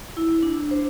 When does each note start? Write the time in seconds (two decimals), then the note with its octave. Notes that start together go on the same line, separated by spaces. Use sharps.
0.17 E4
0.43 D4
0.71 C5